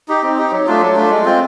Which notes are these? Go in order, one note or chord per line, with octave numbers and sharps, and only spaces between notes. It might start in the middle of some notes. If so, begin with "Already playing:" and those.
D#4 G4
C4
D#4 G4
F#3
A3 D4 F4
F#3
A3 D4 F4
G#3
C4 F4